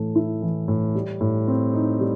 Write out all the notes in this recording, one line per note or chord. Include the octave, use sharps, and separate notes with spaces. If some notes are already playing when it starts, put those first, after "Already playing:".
Already playing: A2 E3 A3
E4
E3
A2
G3
A2
C4
D#4
G3